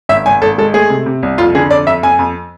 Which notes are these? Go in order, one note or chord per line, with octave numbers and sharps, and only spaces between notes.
G#1 E5
G#1 G#5
G#1 A4
G#3 A4
A3 G#4
C3
C3
C2
F2 F4
D3 G#4
F2 D5
F2 E5
F2 G#5
F2